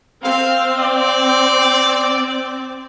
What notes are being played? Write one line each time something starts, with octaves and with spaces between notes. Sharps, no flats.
C4 F5
D5